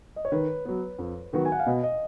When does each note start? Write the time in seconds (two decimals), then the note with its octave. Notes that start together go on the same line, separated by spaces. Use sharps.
0.16 D#5
0.25 C#5
0.32 D#3 B4
0.65 F#3 B3
0.99 F2
1.33 D#3 F#3 B3 F#4
1.45 G#5
1.52 F#5
1.59 F5
1.66 B2 D#5
1.83 D#5